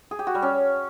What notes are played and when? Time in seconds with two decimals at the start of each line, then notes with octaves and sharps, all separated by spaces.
0.11 G#4
0.19 G4
0.27 F#4
0.35 G3
0.42 C#4